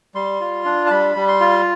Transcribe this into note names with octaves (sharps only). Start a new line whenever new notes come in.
G3 C6
F4
D4
A5
G3 B5
G3
C6
F4